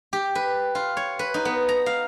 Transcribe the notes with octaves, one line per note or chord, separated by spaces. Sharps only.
G4
B4
F4
C#5
B4
D#4
B3
A#5
F5